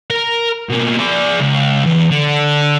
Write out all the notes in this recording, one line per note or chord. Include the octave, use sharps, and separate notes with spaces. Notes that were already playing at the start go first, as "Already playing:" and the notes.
A#4
B2 A#3
G#4 D5
C#2
E2
D3